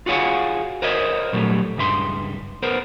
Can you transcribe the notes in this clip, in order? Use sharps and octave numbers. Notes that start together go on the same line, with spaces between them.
F4 F#4 G#4 C#5 F5 F#5
A#4 C5 C#5 D#5 E5
A#2 F#3 G3 A3
C#2 G2 E5 C6
B3 A#4 C5